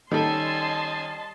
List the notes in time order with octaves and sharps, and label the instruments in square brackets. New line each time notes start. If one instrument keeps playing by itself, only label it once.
[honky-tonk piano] D#3 [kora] G3 A4 [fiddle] C#4 G#5 [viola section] D#5 A5 C6